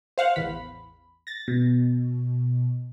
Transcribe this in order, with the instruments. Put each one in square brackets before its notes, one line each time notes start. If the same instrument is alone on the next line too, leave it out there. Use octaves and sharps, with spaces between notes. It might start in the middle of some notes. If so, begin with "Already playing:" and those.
[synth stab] C5 F5 F#5
A1 E2 B5
A6 A#6
[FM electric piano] B2